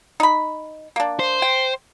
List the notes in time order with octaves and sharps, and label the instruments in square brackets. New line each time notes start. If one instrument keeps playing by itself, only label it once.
[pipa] D#4 B5
A#3 D4
[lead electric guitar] C5
[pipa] G5